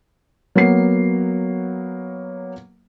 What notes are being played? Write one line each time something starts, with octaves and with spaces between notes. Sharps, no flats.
F#3 A#3 B3 C7